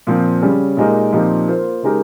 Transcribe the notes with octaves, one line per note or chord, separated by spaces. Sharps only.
A#2 F3 C4
C#3 G3 C#4
A#2 G#3 D#4 G4 A#4
A#2 F3 C4 D#4 G4
A#3 F4 C5
C#3 G#3 D#4 G4 A#4